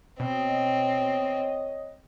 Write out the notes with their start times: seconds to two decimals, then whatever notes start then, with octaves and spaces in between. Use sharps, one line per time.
0.20 B2 C4 C#5 D#5